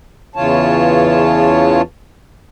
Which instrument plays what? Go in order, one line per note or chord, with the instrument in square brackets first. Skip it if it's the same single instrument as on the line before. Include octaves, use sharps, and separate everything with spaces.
[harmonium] E2 C#3 E3 F4 C#5 A5